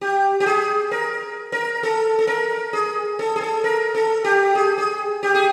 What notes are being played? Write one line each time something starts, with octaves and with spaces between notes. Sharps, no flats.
G4
G4
G#4
A#4
A#4
A4
A4
A#4
G#4
A4
G#4
A4
A#4
A4
G4
G#4
G#4
G4
G#4